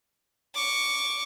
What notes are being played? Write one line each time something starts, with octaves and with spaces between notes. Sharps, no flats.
C#6 D6